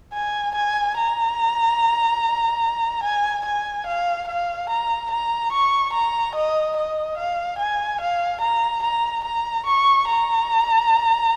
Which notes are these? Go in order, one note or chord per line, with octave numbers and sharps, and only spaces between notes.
G#5
G#5
A#5
G#5
G#5
F5
F5
A#5
A#5
C#6
A#5
D#5
D#5
F5
G#5
F5
A#5
A#5
A#5
C#6
A#5